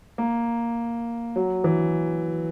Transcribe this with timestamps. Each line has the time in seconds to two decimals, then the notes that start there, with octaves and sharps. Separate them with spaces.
0.18 A#3
1.36 F#3
1.64 E3